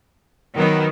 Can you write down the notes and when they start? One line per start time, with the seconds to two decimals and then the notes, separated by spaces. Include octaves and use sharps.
0.56 D#3 F#3 B3